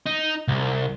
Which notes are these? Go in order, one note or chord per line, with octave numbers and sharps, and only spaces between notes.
D#4
C2